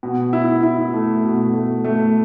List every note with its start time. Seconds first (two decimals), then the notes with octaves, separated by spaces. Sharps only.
0.03 B2
0.33 E4
0.63 E4
0.94 A3
1.24 B2
1.54 A3
1.84 A3